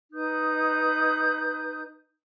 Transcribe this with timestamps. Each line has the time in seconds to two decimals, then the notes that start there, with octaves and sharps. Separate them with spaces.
0.12 D#4 B4 D#6 G6